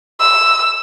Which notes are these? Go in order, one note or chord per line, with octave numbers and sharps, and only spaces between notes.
E6